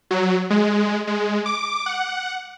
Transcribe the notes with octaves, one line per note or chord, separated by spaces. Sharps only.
F#3
G#3
G#3
D6
F#5